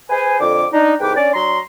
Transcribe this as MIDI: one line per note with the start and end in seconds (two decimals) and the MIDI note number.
0.10 0.39 68
0.10 0.39 71
0.10 0.39 72
0.10 0.39 80
0.40 0.65 41
0.40 0.65 50
0.40 0.65 86
0.73 0.94 62
0.73 0.94 63
1.00 1.15 36
1.00 1.15 44
1.00 1.15 71
1.00 1.15 79
1.00 1.15 86
1.16 1.33 61
1.16 1.33 62
1.16 1.33 74
1.34 1.58 54
1.34 1.58 62
1.34 1.58 82
1.34 1.58 84